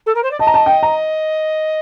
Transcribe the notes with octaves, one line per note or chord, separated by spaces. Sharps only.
A4
A#4
C5
D5
D#5 A5
A#5
A5
G5
A#5